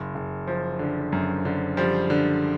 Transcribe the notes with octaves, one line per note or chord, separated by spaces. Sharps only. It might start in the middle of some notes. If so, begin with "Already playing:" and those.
Already playing: F#1
F#1
F3
D3
F#2
D3
F3 G3
D3